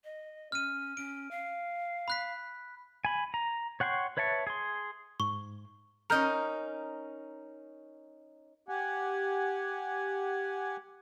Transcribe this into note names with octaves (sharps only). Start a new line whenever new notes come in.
D#5
C#4 F6 D#7
C#4 D7
F5
B5 F#6 B6
G#5 B5
A#5
C#5 F#5 G5 C6 C#6
B4 C#5 E5 A5 C#6
G#4 C6
G#2 C#6
C#4 D#4 A#4 A#5 F6 G6
G4 F#5 G#5